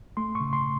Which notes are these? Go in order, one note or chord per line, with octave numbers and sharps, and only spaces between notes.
A3 C6
C#6
C#3
C6